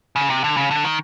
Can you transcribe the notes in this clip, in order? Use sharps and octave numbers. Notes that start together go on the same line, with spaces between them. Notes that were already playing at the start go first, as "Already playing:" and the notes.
C#3
C3
D3
C#3
D3
D#3